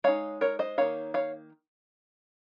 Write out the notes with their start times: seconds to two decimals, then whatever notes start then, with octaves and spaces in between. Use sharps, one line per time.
0.04 G#3 D#4 C#5 F5
0.41 A#4 C#5
0.59 C5 D#5
0.78 D#3 A#3 D#4 C#5 F5
1.14 C#5 F5